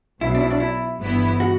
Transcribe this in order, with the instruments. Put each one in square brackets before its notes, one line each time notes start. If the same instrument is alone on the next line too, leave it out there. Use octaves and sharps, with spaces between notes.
[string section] B1 B2 F#3 [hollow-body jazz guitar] E4
[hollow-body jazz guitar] D4
E4
D4
E4
[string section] G1 G2 E3 B3 E4
[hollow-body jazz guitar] F#4